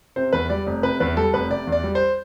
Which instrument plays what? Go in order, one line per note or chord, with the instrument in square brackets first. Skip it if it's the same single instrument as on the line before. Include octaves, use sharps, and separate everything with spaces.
[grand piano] C3 C5
E2 B4
G3 D5
F1
C3 B4
E2 B4
G3 A4
F1 B4
C3 D5
E2
D5
G3
C5